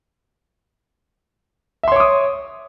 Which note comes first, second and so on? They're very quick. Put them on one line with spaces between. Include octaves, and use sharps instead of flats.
E5 C6 C#5 D6 D#6